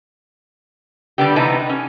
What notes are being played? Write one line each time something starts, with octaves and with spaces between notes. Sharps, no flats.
D3 G3 B3 D4 G4
C3 E3 B3 D#4 A5
C#4